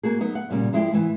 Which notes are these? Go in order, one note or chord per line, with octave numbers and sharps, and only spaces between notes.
A#3 F#4 G#4
F#3 B3 D#4
F#5
A#2 C#3 G3
F3 G#3 E4 C5 G5
G#2 E3